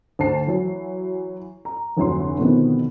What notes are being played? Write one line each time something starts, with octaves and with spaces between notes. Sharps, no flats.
D2 C5 A5 C7
E3 F#3
A#5
F1 D2 E3 F#3 C6
B2 D3 D#3 F3 B3 C4